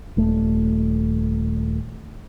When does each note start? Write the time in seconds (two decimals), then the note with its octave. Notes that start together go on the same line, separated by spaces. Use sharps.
0.17 D#1 A3